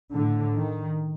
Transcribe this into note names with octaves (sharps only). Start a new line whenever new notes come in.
A2 D3
D#3